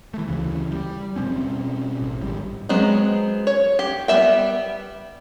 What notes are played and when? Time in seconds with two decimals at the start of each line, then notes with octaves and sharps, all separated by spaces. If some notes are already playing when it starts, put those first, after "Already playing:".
0.14 E3 A3
0.27 D2 C#3 E3
0.71 G3
1.16 B2 G3 C4 C#4
2.01 A1
2.21 G#1 G3
2.69 F#3 G#3 B3 C4
3.47 C#5
3.79 G4
4.08 G3 B3 E5 G5